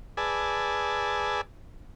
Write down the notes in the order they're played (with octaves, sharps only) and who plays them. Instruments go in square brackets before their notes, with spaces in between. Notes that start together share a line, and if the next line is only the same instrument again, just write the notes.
[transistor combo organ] G#4 B4 D5 G#5 A5 E6